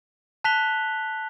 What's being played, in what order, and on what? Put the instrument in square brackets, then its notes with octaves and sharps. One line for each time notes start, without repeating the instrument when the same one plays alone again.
[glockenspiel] A5 F#6 B6 F7 G7